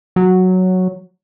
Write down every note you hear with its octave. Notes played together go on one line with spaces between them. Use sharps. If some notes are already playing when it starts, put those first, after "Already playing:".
F#3